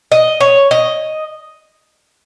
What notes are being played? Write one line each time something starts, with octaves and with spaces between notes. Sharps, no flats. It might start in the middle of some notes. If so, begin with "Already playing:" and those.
D#5
C#5
D#5